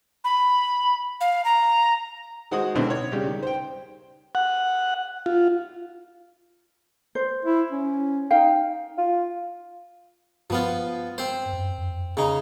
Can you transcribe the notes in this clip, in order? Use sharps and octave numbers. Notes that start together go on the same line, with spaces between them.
B5
F5
A#5
D#3 G#3 F#4 C5 F#5 D#6
B1 B2 D3 D#3 C4 E4
C#5
C#3 G3 G4
D#3
C5 G5
F#5
F4
C5
E4
C#4
D#4 F5 G5
F4
G2 F3 B3 F4
C4 C5
F#2
F2
C#3 D#4